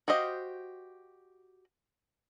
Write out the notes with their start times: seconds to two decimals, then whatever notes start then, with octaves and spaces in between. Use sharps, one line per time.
0.08 F#4 G4 C5 D#5 F5